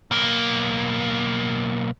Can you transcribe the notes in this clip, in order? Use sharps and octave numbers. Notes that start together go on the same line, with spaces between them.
B1 A#3